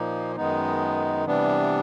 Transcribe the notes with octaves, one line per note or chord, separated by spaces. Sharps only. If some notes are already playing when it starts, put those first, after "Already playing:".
Already playing: A#2 F3 A#3 D#4
F#2 D#3 G#3 B3 D#4
C3 E3 G3 B3 D4